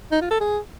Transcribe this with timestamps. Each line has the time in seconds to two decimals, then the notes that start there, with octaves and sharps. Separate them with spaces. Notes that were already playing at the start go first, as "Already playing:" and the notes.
0.11 D#4
0.21 F4
0.31 A4
0.40 G#4